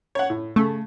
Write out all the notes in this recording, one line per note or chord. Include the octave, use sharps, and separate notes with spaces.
C#5 F#5
A2
C#3 A3